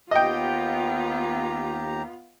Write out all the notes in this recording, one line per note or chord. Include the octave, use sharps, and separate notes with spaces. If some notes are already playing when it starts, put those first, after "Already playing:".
D#2 B3 F4 G4 D#5 G5 A#5